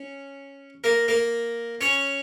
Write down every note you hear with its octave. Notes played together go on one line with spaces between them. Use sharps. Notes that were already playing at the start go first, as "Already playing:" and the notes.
Already playing: C#4
A#3 A#4
A#3 A#4
C#4 C#5